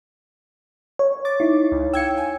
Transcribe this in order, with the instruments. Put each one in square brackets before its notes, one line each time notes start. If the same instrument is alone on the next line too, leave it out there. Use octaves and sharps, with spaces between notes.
[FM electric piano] C#5
[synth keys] D6 [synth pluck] A6
[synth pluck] D#4 E4
[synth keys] C#2
[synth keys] F5 G5 [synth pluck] E6 G#6 C#7
[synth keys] G#5